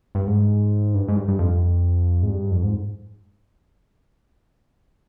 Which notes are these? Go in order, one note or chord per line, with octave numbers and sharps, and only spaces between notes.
G2
G#2
G2
G#2
G2
G2
F2
G#2
G2
F2
G#2